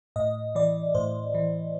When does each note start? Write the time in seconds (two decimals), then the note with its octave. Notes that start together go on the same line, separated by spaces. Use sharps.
0.16 A2 D#5
0.55 E3 D5
0.95 A2 C5
1.34 E3